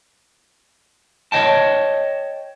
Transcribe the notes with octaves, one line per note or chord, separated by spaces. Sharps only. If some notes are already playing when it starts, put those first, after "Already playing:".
C#5 D#5 G5 A5